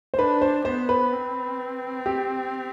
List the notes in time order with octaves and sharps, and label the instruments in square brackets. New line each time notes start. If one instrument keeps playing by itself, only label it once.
[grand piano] C5
[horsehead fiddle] D4 [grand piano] B4
[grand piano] C5
[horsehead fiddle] B3 [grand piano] C5
[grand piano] B4
[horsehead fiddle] C4
[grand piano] G4